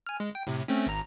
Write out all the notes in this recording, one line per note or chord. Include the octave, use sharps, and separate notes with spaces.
G#5 F6
G#3
G5
A2 C3
A3 C4 C#4
G#1 A#5